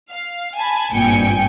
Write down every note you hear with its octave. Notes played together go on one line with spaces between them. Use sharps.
F5
G#5 A5 B5
G#1 G2 A#2 G5 G#5 C#7